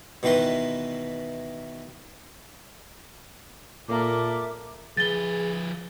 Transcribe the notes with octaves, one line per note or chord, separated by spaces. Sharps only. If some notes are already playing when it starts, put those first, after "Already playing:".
B2 D#3 E3 B4 C6
A#2 A#3 A4 E5 D6
F3 G#4 B4 A6 G7